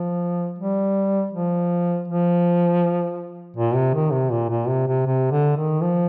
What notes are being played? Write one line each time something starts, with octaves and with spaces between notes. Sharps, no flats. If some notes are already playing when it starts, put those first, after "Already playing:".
Already playing: F3
G3
F3
F3
A#2
C3
D#3
C3
A#2
A#2
C3
C3
C3
D3
D#3
F3